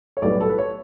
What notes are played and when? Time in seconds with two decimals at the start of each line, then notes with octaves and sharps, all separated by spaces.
0.17 C#5
0.22 B1 A2 G3 B3 D5
0.40 A4
0.50 B4
0.58 C#5